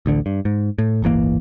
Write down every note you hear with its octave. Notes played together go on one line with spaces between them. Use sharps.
A1 D2 D3
G2
G#2
A2
D1 G1 E3 A#3